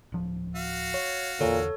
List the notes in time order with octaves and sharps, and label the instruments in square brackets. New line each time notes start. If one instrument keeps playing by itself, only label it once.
[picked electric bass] D1 F3
[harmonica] F#4 F5
[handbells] C#5
[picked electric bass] E2 D3 [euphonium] A#2 [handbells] A4 C#5